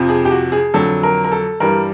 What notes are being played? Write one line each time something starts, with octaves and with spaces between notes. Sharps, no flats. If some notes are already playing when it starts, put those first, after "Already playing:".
Already playing: F2 C3 F3
G#4
G4
F#4
G#4
F2 D3 F#3 A4
A#4
A#4
A4
G2 E3 G3 A#4